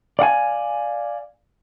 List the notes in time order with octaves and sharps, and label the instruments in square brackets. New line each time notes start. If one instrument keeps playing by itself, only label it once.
[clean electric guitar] D5 F5 F#5 G#5